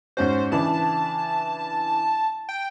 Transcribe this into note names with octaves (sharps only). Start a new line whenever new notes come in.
G#2 C#4 F#4 C5
C#3 E3 D4 A5
G5